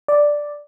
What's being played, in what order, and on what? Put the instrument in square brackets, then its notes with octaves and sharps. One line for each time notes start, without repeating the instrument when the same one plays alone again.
[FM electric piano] D5